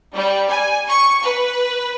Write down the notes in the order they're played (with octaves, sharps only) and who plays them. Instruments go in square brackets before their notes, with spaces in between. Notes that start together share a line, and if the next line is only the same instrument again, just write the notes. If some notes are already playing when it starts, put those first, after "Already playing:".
[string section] G3
G#5
C#6
B4